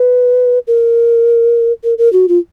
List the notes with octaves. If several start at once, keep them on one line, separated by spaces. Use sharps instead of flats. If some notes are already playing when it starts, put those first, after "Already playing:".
Already playing: B4
A#4
A#4
A#4
F#4
F4